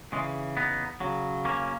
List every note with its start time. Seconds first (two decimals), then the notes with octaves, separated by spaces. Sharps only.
0.12 C#3 E3 G#3
0.57 B3 D#4
1.00 C#3 F#3
1.45 A#3 C#4